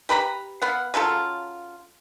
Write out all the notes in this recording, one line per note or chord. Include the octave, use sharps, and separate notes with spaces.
G4 B4 A#5 B5
B3 F5 F#5
C#3 F#3 F4 A4